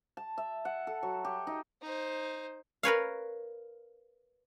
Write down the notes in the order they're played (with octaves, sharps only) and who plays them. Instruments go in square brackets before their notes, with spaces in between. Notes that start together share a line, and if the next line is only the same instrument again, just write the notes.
[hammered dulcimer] A5
E5
F#5
A4
F#3
G4
D#4
[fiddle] D#4 C5
[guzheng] A#4 B4 C#5 F5